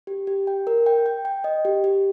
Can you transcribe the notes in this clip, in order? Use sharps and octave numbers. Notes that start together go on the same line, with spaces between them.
G4
G4
G5
A#4
G5
G5
G5
D#5
G4
G4